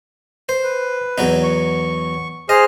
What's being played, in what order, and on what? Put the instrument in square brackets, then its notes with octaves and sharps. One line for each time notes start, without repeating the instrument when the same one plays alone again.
[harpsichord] C5
[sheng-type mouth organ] B4
[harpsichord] E2 F#3 D#4
[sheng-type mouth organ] C#6
[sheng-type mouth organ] G#4 C5 F6 [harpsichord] D#5